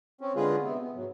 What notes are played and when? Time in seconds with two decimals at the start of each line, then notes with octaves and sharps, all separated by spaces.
0.21 C4 C#4
0.36 D3 G#3 F4 G#4 B4
0.63 C3 B3 C4
0.80 B3
0.95 G#2 F#3